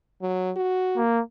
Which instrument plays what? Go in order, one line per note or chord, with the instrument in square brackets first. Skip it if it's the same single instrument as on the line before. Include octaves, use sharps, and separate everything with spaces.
[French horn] F#3
F#4
[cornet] A#3